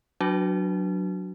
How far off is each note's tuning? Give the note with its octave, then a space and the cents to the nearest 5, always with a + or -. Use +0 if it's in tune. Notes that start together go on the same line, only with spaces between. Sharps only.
F#3 +0 D4 +0 F#4 +0